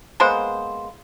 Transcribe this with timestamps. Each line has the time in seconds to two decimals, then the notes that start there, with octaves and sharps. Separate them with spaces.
0.20 G#3 A#3 B3 C5